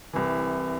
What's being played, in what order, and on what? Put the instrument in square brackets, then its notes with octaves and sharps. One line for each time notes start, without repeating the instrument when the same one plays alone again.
[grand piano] C2 C3 E3